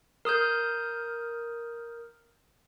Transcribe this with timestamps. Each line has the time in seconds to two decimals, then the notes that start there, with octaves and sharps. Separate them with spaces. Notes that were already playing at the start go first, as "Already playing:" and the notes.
0.25 A#4 D#6 F6 G6